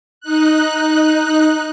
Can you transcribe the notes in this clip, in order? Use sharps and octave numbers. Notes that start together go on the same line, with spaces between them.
D#4 F#6